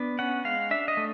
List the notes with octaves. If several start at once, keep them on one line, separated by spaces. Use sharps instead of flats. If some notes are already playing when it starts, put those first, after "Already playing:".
Already playing: B3 D4
C#4 F#5
G#3 F5
D4 E5
D#5
A3